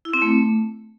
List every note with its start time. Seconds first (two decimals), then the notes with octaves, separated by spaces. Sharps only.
0.05 E4
0.14 C4
0.22 A3